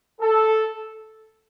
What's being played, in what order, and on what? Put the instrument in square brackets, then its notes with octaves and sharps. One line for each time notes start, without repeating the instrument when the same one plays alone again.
[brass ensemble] A4